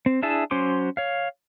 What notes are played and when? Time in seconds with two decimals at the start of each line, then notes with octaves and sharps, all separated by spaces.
0.06 C4
0.22 D4 E4 G#4 E5 A5
0.51 F#3 C#4 C5 C6 D6
0.97 C#5 F5